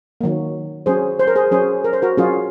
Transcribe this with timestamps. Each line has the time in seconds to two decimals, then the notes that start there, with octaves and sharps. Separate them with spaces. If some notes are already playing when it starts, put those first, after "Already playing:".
0.21 D#3 F#3 A#3
0.86 F#3 C#4 G#4 C5
1.19 C5
1.27 A#4
1.35 G#4 C5
1.51 F#3 C#4 G#4 C5
1.84 A#4
1.93 C5
2.02 F#4 A#4
2.17 F#3 C#4 F4 G#4